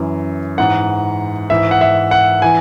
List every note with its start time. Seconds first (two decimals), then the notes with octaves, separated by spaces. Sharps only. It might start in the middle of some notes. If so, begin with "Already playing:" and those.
Already playing: F#2 E3
0.58 G#2 E3 F#5
1.50 G#2 E3 E5
1.71 F#5
1.81 E5
2.11 F#5
2.42 E3 G#5